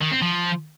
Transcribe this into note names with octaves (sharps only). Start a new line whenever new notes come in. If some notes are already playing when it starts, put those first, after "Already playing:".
D#3
C4
F3